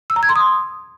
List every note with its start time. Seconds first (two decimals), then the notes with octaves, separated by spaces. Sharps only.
0.10 E6
0.16 A#5
0.23 G#6
0.29 C6
0.36 D#6